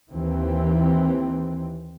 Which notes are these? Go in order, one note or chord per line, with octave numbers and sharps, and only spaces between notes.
D#2 E3 C4